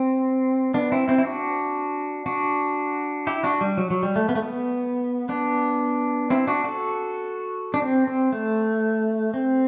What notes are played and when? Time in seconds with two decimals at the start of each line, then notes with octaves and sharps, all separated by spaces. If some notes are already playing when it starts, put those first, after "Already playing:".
Already playing: C4
0.74 B3 D4
0.92 C4 E4
1.08 C4 E4
1.18 E4
1.25 D4 F#4
2.26 D4 F#4
3.27 E4 G4
3.43 D4 F#4
3.61 G3
3.77 F#3
3.90 F#3
4.03 G3
4.16 A3
4.29 B3
4.35 A3
4.42 B3
5.29 B3 D4
6.30 C4 E4
6.47 D4 F#4
6.64 F#4 A4
7.74 D4
7.82 C4
8.08 C4
8.32 A3
9.34 C4